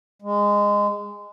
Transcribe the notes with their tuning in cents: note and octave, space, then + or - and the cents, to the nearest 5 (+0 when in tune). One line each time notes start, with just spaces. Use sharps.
G#3 -15